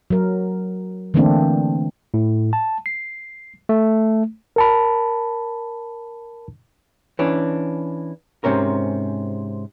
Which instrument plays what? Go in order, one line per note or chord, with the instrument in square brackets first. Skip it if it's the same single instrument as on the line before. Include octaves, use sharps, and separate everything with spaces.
[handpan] F#3 A#4
D3 E3 A3 A#3 C4 D4
[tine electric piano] A2
A5
C7
A3
[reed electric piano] A#4 A5 B5
[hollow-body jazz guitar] E3 C#4 D4
G#2 C3 C#4 A#4